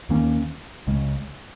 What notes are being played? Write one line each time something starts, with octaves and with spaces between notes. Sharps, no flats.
D#2 D#3 A#3 C#4
C#2 C#3 G#3